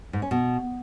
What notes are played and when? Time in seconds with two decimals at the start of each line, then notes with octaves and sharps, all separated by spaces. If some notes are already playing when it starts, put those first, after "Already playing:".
0.13 G#2
0.22 C#4
0.31 B2